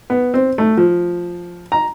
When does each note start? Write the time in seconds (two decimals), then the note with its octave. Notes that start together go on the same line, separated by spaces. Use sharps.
0.10 B3
0.34 C4
0.58 A3
0.77 F3
1.72 A#5